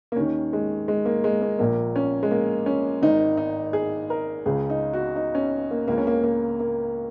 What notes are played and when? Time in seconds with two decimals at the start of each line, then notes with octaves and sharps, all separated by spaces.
0.12 A#3
0.16 D#2 D#3 C#4
0.53 G#3
0.88 G#3
1.05 A#3
1.24 G#3
1.42 A#3
1.59 A#1 A#2 A#3
1.96 C#4
2.23 G#3
2.31 A#3
2.66 C#4
3.02 G#1 G#2 D#3 D#4
3.37 D#4
3.73 G#4
4.10 A#4
4.46 C#2 C#3 G#4
4.70 D#4
4.93 F#4
5.16 D#4
5.35 C#4
5.71 A#3
5.88 C#2 C#3 A#3
5.98 C#4
6.07 A#3
6.24 A#3
6.60 A#3